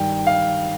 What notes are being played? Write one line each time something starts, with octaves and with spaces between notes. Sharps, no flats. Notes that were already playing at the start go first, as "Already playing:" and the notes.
Already playing: G2 D#3 G3 G5
F5